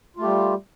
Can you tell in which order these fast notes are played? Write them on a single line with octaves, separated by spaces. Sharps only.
F4 A3 G4 G3